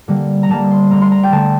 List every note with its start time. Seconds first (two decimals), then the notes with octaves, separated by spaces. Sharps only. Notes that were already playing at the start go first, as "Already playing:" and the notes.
0.08 D3 G3 A#3
0.43 A#5
0.49 D3 G3 A#3 A5
0.71 C6
0.91 D3 A3 A#5
1.02 C6
1.12 A#5
1.23 G5
1.32 D3 A3 A5